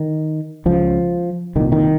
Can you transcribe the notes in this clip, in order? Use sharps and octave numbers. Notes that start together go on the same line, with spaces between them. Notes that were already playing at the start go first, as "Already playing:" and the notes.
Already playing: D#3
C#2 C#3 F3
C2 A#2 D#3
D#3